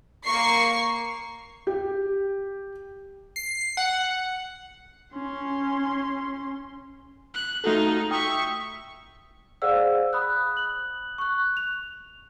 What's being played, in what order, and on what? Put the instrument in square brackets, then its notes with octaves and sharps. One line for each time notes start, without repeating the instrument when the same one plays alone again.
[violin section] A#3 C#6 C7
[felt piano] G4
[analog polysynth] C7
F#5
[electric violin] C#4 C6
F#6
[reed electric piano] A3 F#4 A4 [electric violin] D#4 F4
[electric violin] E5 C#6 [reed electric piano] G5 D#6
[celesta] G#4 C5 D5 F5 F#5 E6
B5 D#6 F#6
F#6 F#7
C#6 F#6
F7